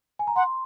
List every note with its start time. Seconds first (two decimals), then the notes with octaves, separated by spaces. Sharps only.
0.19 G#5
0.27 A#5
0.36 F#5 C6